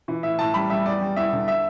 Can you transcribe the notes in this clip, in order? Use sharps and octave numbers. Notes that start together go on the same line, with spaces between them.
E3
A2 E5
A2 A5
G3 B5
G3 E5
E2 D5
G3
E2 E5
D3
E5